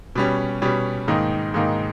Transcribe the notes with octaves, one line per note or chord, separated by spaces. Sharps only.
B2 G3 C#4
B2 G3 C#4
G#2 D#3 A#3 D#4
G#2 D#3 A#3 D#4